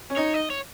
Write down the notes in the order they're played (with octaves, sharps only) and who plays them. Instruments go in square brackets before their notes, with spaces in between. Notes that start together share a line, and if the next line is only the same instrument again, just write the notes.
[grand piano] C#4
[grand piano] D#4 [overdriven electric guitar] C#5
[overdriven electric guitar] D#5
C#5